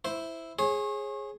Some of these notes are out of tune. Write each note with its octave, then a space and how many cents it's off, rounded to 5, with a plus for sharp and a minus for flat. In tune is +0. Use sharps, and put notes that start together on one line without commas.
E4 +0 C5 +0
G#4 +0 C#5 -35